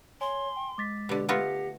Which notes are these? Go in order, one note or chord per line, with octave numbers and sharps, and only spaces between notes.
C#5 G#5 C6
G5
G#3 D6 A6 B6
B2 D3 G4
A3 B3 F4 G4 F#5 A#6 C#7